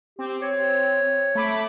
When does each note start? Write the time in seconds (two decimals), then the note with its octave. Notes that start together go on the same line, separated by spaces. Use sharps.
0.19 C4 G4
0.42 C#5
1.35 A3 B5 D6